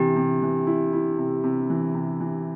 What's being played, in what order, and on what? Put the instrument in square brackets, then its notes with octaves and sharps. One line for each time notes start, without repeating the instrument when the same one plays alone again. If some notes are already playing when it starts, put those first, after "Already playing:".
Already playing: [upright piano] C3 E3 [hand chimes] G4
[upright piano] C3
E3
E4
E4
C3
C3
E3
C3
E3